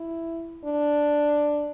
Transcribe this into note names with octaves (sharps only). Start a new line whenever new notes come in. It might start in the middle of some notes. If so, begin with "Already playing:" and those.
Already playing: E4
D4